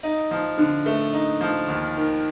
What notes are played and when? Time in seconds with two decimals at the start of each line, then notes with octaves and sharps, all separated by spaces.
0.03 D#4
0.31 F3
0.58 D3
0.86 A3
1.13 D#4
1.41 F3
1.68 D#2
1.96 D#3